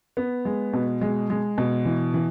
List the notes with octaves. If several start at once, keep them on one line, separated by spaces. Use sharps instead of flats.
B3
G#3
B2
G#3
G#3
B2
E3
E3